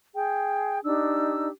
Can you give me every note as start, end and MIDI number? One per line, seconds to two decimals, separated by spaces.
0.14 0.79 68
0.14 0.79 79
0.84 1.48 62
0.84 1.48 63
0.84 1.48 67
0.84 1.48 88